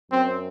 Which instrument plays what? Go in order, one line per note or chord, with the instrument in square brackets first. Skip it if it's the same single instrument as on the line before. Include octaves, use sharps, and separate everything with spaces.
[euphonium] F#2 [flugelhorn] C4